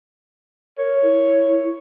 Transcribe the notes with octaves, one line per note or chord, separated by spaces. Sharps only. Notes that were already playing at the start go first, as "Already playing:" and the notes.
A#4 C#5
E4